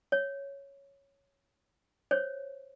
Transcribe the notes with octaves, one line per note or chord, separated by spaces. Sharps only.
C#5
C5 C#5